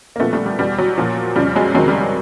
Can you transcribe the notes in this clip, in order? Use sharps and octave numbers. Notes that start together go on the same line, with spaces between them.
A#3
A#2 F3 A3 B3
G3 A3
G3
E2 B2 G3
F#3
A#2 F3
F2 C#3 F3 G3
F#3 G#3
F2 C3 D#3 F#3 G#3
G3
G3